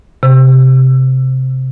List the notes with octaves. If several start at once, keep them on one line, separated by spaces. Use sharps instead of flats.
C3